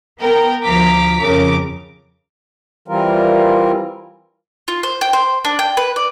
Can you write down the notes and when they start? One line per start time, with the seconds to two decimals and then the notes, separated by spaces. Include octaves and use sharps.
0.19 B3 A#4 G5
0.64 D2 F3 F5 A#5 D6 B6
1.22 F2 C#3 A#4 D6
2.88 E3 G3 C4 F4 A#4
4.68 F4
4.83 C5
5.01 G5
5.13 C5
5.45 D4
5.59 G5
5.77 B4
5.96 D5